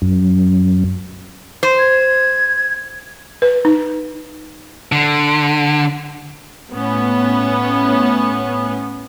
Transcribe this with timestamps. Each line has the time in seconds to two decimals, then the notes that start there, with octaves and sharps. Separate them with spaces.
0.02 F#2
1.63 C5
1.79 G#6
3.42 B4
3.65 D#4
4.92 D3
6.73 A2 B3 C#4